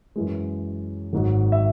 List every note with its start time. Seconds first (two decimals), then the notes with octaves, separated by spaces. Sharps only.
0.16 F#2 E3 G#3
1.13 G#1 G#2 F#3
1.52 E5